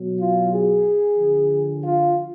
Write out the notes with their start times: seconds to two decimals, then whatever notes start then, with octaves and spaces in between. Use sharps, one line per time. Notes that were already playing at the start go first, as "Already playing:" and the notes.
Already playing: B2 F#3
0.20 F4
0.52 G#4
1.18 D3 F3
1.84 F4